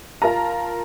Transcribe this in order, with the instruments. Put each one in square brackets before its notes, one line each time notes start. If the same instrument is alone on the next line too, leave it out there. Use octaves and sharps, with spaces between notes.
[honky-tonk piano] F4 A#4 A5 A#5